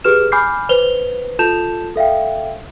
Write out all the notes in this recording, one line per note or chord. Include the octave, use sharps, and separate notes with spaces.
G4 G#4 B4 F6 E7
G#5 B5 D6 F6 G6 C7
B4 C5 F7 G7
F4 A4 A5 G6 E7 F7
A4 E5 F5 G5